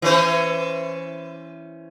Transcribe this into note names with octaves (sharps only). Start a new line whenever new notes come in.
E3 C#4 C5